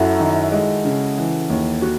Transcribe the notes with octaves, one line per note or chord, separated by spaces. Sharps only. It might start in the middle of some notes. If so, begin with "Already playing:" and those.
Already playing: F#2 E4 F#4 A4
D#3
G#3
C#3
E3
D#2
F#4